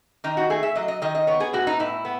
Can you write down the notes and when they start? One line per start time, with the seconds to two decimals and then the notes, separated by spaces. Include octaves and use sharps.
0.24 D#3 D#4
0.37 F#4
0.50 A3 G#4
0.63 E5
0.75 F#3 D#5
0.88 D#5
1.02 D#3 D#5
1.15 D#5
1.27 B3 C#5
1.40 G#4
1.53 A2 F#4
1.67 D#4
1.80 A2 E4
2.05 B3